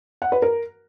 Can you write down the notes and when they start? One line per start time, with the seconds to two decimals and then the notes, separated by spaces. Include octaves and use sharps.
0.22 F#5
0.32 B4
0.42 A#4